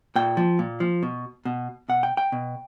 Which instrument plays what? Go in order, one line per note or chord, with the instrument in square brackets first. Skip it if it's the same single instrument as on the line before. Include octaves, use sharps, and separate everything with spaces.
[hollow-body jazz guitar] A#2 G5
F3
A#2
F3
B2
B2
B2 F#5
G5
G5
B2